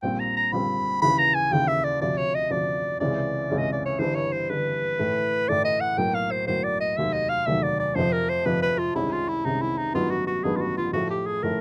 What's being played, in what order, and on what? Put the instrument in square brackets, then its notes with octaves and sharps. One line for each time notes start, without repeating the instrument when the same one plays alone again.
[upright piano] A#1 A#2 G3 C4 [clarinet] G5
[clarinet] A#5
A#5
[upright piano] A#1 A#2 G3 C4 [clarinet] B5
[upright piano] D#2 C#3 E3 [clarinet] B5
[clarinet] A#5
G#5
[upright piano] D#2 C#3 E3 [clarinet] G5
[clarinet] E5
D5
[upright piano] D2 C3 F3 [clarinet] D5
[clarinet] C#5
D#5
[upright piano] D2 C3 F3 [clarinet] D5
[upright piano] C#2 C3 E3 G#3 C#4 [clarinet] D5
[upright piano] C#2 C3 E3 G#3 C#4
[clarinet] D#5
D5
C#5
[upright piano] G1 G2 E3 [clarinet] C5
[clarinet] C#5
C5
[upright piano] G1 G2 E3 [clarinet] B4
[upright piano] A2 E3 A3
[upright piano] A2 E3 A3 [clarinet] D5
[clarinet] D#5
F#5
[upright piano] B1 A2 F#3 A#3 [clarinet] G5
[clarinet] F5
C5
[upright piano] B1 A2 F#3 A#3 [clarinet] C5
[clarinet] D5
D#5
[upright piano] F1 D#2 D#3 F#3 [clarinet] E5
[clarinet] D#5
F5
[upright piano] F1 D#2 D#3 F#3 [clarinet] E5
[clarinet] D5
D5
[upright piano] F2 C3 F3 [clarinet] C5
[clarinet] A#4
C5
[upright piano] F2 C3 F3 [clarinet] B4
[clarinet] B4
F4
[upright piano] C2 C3 D#3 G#3 C#4 [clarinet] E4
[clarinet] F4
E4
[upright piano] C2 C3 D#3 G#3 C#4 [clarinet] D#4
[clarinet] E4
D#4
[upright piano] A1 G2 D#3 F#3 B3 [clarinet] F4
[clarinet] F#4
F#4
[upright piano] A1 G2 D#3 F#3 B3 [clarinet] G#4
[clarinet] F4
F#4
F4
[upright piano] A2 F3 A3 [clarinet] F#4
[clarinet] G4
G#4
[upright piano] A2 F3 A3 [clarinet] A#4